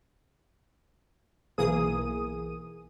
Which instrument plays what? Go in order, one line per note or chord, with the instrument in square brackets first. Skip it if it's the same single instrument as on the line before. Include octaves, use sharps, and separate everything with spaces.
[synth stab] B1 E3 A#3 G#4 D#6 D#7